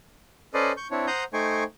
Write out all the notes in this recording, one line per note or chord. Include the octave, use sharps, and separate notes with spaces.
C#4 A4 B4 C5 D5 D#5
C#6 G6
C4 D4 E4 C#5
C5 F#5 A#5 D#6 G6
A3 D#4 C5 G5 G#5 C#6